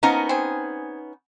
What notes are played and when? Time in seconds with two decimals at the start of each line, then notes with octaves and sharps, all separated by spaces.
0.03 F3 A#3 B3 C#4 D#4 A#4
0.29 C4 G#4